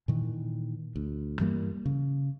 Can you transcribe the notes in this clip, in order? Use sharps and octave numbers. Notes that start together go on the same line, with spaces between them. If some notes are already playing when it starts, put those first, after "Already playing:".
A#2 D#3 E3
D2
G2 E3 G3 A#3
C#3